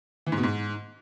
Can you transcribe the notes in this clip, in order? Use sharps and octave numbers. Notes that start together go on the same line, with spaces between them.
E3
G#2
B2
G#2